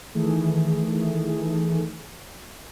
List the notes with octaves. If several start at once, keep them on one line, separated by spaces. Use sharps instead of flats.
D#3 E3 A3 G#4